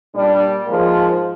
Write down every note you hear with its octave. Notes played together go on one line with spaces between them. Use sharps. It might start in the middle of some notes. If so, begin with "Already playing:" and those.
A#2 G3 D4
G#2 F3 G#3 A#3